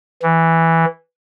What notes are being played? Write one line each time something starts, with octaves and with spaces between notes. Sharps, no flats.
E3